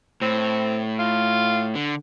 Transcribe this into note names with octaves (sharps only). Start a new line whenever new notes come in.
A2 C4
F4
D3